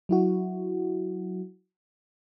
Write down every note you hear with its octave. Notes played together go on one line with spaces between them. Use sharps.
F#3 E4 F#4